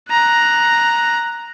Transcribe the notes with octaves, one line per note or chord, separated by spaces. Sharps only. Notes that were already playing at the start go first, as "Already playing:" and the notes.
A#5 F#6